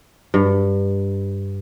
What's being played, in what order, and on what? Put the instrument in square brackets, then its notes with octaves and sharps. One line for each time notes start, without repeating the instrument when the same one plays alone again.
[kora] G2